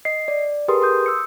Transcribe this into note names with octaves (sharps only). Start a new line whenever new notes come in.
D#5 C7
D5
G4 G#4 A#4 B4 C6 D#6
C6 D#6 G6
E6 C#7